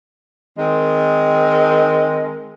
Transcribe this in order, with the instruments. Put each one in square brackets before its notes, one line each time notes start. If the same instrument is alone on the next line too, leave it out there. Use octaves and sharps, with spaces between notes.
[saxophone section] D#3 G#3 C4 A#4